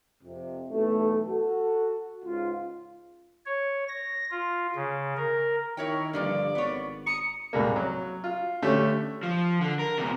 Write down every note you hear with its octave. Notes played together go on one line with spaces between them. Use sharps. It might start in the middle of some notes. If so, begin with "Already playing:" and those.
F2 C3
B1 E3 A3
F#4 A4
C#2 G#2 F4
C#5
A#6
F4
C#3
A#4
D#3 E4 A#4 C#5 G5
G2 D3 F3 A#3 D5
G#1 B3 C#5
A#5 D#6 C#7
C2 G#2 A#3
F#3
F4
D3 A3 C#4 G4
F3
D3
A#4
E2 C3